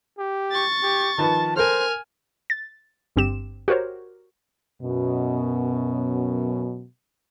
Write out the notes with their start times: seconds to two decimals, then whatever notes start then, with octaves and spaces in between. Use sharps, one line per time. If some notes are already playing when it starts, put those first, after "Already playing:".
0.18 G4
0.51 C#6 A6
0.83 G4
1.18 D#3 F3 B4 A5
1.56 A4 A#4 C5 G#5 F6
2.50 A6
3.16 G1 G2 C4 G4 E7
3.68 F#4 G4 A#4 C5 C#5
4.82 F#2 B2